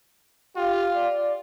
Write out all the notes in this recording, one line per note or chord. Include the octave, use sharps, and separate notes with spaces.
F4 G4
D5